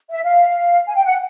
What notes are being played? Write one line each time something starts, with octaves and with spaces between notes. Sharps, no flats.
E5
F5
G#5
G5
F#5